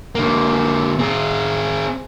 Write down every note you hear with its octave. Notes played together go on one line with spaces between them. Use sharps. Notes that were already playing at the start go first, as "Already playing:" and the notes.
D3 A#3
C4 G#4